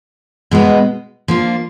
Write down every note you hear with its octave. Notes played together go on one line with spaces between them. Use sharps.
B2 G#3 B3
F3 A#3 D4 F4